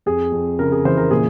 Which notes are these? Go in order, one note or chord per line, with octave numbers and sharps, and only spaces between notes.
F2 G#4
F2
C#3 A#4
G#4
E3 C5
A#4
A#2 G#4